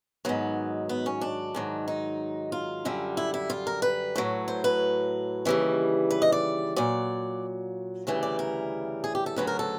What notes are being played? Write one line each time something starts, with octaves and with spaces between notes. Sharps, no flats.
G#2 D#3 F#3 B3
B3
C#4
D4
G#2 D#3 F#3
D#4
F4
F#2 D3 G3
E4
E4
F4
A#4
B4
A2 F#3
C5
B4
D#2 C#3 E3 G3
B4
D#5
D5
A#2 F#3 D5
D2 C#3 E3 G3
D5
A#4
G#4
G4
A4
D2 C#3 F#3 B4
A#4
A4